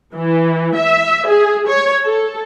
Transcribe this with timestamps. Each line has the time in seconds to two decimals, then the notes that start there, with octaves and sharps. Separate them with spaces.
0.14 E3
0.76 E5
1.27 G#4
1.67 C#5
2.03 A4